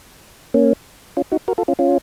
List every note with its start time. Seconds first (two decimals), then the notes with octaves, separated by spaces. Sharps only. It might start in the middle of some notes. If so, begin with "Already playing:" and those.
0.54 A#3 C#4
1.17 C#4 F4
1.32 D#4 F#4
1.48 F#4 A#4
1.58 F4 A4
1.68 C#4 F4
1.79 C#4 F4